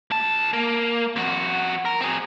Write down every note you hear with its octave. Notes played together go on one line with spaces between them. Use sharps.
D2 A5
A#3
F2 F#4
A#4
C4 G#4